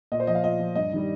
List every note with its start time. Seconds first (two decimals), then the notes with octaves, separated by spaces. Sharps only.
0.12 A#2 D#5
0.20 C5
0.27 F3 D#5
0.35 F5
0.43 A#2 D#5
0.59 F3
0.75 G2 D#5
0.93 D#3 G3